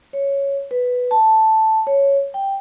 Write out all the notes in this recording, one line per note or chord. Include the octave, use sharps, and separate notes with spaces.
C#5
B4
A5
C#5
G5